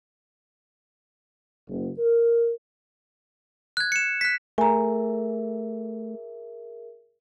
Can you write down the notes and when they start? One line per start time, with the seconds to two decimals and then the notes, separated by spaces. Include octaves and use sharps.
1.69 F#1
1.99 A#4
3.77 F#6 G#6
3.92 C#7 E7
4.21 F#6 B6
4.58 A3 G#4 A#4 E5 G#5 A#5